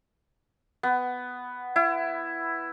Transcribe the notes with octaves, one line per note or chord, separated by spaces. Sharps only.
B3
E4